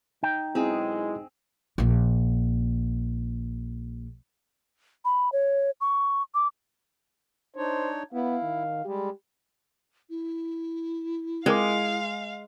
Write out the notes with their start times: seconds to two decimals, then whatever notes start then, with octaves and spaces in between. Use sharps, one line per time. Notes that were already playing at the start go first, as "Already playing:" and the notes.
0.23 D#4 G5
0.55 B1 G#3 C4 E4 G#4
1.78 A#1 A#3
5.05 B5
5.32 C#5
5.81 C#6
6.35 D6
7.56 D4 D#4 C5 C#5
8.13 B3 E4 F5
8.43 D#3
8.85 G3 G#3 G4
10.09 E4
11.46 G#3 C4 A#4 F5 D6